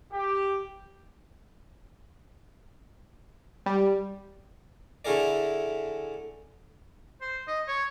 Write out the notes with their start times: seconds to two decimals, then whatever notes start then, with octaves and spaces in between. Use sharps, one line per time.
0.12 G4
3.66 G3
5.05 D3 A3 E4 G#4 A#4 D5
7.21 C5
7.47 D#5
7.67 C#5